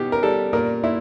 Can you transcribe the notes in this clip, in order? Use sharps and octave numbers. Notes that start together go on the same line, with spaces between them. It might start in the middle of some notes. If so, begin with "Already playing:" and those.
Already playing: B2 B3 G4
A#4
G3 A4
A#2 A#4
A#2 E4